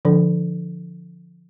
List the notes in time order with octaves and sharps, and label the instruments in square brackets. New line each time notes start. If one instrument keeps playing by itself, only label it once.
[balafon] D3 F3 D4 A4